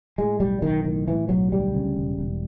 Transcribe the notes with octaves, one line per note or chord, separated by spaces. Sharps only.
A2 G#3
B1 G3
B1 D#3
A2 D#3
A2 E3
B1 F#3
D2 G3
C#3
E1
E1